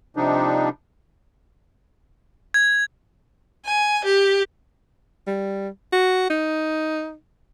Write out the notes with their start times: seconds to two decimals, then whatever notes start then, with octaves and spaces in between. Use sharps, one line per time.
0.17 C3 F3 G3 D4 D#4
2.54 G#6
3.65 G#5
4.05 G4
5.27 G3
5.92 F#4
6.30 D#4